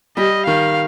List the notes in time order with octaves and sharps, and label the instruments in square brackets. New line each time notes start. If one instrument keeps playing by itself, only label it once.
[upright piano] G3 [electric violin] D#5
[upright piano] D#3 [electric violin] F5